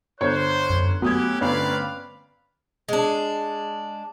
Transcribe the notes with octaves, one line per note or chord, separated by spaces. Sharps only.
G1 C5 C#5 F#6
F#2
F#3 A3 B3 C#4 E4 G4 D#6 G#6
G1 C4 C#4 B4 D5 F5
G#3 D4